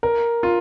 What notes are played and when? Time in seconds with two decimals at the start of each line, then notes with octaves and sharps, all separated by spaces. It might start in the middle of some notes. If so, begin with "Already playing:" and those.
0.03 A#4
0.43 F4